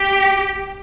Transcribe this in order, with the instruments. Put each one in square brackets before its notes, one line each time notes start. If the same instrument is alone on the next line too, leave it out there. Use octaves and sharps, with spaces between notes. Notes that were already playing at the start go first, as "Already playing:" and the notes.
Already playing: [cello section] G4